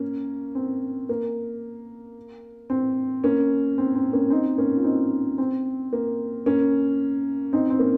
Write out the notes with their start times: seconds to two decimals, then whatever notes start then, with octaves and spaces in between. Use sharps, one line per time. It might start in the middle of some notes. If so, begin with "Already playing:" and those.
Already playing: A#3 C#4
0.55 C4
1.09 A#3
2.70 C4
3.24 A#3 C#4
3.78 C4
3.95 C4
4.13 A#3 C#4
4.30 C4 D#4
4.58 A#3 C#4
4.77 F4
4.84 C4 D#4
5.38 C4
5.93 A#3
6.46 A#3 C#4
7.53 C4 D#4
7.70 C4
7.79 A#3 C#4